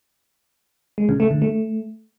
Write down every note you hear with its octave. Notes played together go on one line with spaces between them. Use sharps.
G#3
C#3
A3
D3
A3